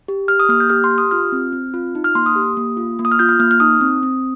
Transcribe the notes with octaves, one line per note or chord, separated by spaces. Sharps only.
G4
G4 F6
D#6
A#3 F6
G6
G4 F6
C6
G4
D#6
F4 F6
C4
C4
F4
D#4
F6
A#3 C6
D#6
G4
A#3
F4
A#3
D#6
F6
F4 G6
F6
A#3 F6
F6
D#4 D#6
C4
C4